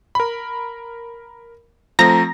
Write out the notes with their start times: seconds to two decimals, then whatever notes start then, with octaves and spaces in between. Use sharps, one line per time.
0.15 A#4 B5
1.99 F3 A3 C4 A#5 A#6